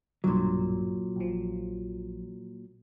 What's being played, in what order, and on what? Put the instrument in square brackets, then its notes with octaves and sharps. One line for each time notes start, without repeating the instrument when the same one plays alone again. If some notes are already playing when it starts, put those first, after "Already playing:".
[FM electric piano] B1 G2 [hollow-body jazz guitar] A#2 F#3
[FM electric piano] A#1 F3